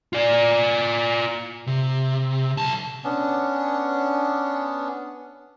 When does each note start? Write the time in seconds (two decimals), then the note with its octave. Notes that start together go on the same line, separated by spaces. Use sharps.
0.13 F4 D5
1.67 C3
2.57 B1 A5
3.04 B3 C#4 D4